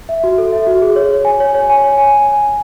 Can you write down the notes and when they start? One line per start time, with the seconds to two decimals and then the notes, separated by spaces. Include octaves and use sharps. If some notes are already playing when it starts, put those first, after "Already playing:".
0.09 E5
0.24 F#4
0.38 A4
0.52 E5
0.67 F#4
0.82 G#4
0.96 C#5
1.11 C#5
1.25 G#5
1.40 C#5
1.54 C#5
1.70 G#5
1.84 C#5
1.98 G#5